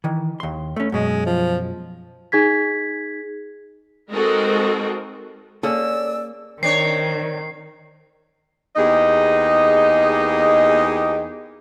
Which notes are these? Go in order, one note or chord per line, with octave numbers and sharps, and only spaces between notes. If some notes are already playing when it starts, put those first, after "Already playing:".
D#3 E3
D#2 C6
A3 C#4
F#2 B2 G#3
F3
D#4 G#4 G#6 B6
G#3 C4 D#4 F#4 A4 A#4
A#3 C#4 G#4 A4 D5 E6
D#3 C4 D4 C#5 C7
E2 A#3 D#4 G4 G#4 D#5